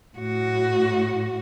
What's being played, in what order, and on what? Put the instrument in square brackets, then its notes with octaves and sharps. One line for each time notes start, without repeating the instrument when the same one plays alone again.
[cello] A2 F#4